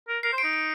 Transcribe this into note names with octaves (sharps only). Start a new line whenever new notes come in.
A#4
A#4 C7
C5
D7
D#4
D7